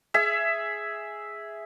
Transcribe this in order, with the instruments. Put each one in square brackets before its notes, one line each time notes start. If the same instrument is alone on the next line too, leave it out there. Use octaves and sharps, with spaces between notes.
[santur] G#4 E5